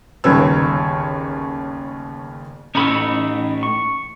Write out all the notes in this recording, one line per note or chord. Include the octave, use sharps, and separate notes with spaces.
G1 D#2 C#3 C#5 E6
A2 A3 C#4 D#4 B5 E6
C#6